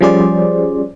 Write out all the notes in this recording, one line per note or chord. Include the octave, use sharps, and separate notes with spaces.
F3 G3 C#4 G#4 C5 D5